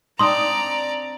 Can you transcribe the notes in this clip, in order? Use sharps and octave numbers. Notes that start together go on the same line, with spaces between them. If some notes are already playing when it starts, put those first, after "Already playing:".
C4 D4 D#4 D5 A#5 C6 D#6